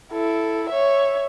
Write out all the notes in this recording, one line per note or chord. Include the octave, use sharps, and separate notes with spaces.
E4 A4
C#5 E5